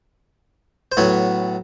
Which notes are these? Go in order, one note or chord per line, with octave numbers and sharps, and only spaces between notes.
C5
A2 F#3 B3 C#5